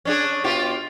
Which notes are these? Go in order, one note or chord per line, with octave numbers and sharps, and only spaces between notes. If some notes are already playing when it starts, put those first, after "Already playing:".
C#4 D4 G#4
B2 F4 G4